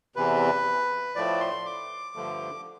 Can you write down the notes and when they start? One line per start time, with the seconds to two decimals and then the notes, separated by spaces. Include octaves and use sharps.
0.16 E2 C3 E3 B4
1.15 A2 F3 A3 D5
1.40 C6
1.66 D6
2.15 G2 D3 F3 A3